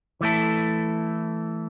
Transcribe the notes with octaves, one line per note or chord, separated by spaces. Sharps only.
E3 A3 E4 A4